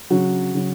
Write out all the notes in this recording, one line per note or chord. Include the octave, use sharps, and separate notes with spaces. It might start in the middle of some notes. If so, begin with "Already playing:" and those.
C#3 F#3 F#4
C#3 F#3